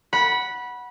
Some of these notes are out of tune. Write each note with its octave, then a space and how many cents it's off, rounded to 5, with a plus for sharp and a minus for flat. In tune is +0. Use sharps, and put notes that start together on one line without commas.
F#5 +0 B5 -20